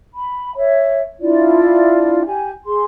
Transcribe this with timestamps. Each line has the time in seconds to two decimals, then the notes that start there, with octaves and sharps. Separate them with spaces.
0.14 B5
0.55 C#5 E5
1.20 D4 E4 F4 D5
2.26 G4 G#5
2.66 G#4 C6